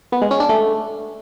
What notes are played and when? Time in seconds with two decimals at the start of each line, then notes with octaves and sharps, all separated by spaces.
0.12 B3
0.22 G#3
0.31 C#4
0.40 D4
0.49 A3